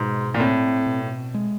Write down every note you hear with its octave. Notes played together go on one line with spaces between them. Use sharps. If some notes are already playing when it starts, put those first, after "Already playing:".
Already playing: G#2 B2
A#2
A2 C4
B2
G#3